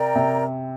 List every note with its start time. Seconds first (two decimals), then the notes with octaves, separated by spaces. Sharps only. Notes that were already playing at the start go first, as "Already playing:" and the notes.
Already playing: C3 A#4 D5 G5 A#5
0.15 C3